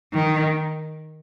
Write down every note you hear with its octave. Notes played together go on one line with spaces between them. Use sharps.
D#3